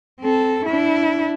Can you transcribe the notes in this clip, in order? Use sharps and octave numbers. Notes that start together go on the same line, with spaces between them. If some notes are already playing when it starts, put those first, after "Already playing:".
C4 A4
D4 E4